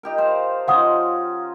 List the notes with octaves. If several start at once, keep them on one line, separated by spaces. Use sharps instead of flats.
D#4 G4 A#4
C5 F5 A5
F3 C#4 D#4 F5 F#5 D#6